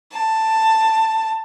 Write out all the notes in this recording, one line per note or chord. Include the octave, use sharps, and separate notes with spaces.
A5